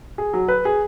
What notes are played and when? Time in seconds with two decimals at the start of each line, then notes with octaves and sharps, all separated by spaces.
0.18 G#4
0.34 F#3
0.48 B4
0.65 G#4